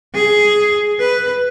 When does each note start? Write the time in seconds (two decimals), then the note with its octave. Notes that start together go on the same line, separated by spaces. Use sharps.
0.15 G#4
1.00 B4